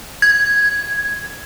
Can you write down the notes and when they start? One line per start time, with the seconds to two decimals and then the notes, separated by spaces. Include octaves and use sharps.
0.22 G#6